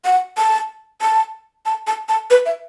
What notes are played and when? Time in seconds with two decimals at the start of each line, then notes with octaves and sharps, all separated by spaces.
0.05 F#5
0.37 A5
1.02 A5
1.66 A5
1.87 A5
2.09 A5
2.30 B4
2.46 E5